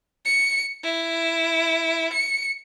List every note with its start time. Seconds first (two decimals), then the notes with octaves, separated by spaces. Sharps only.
0.25 C#7
0.84 E4
2.13 C#7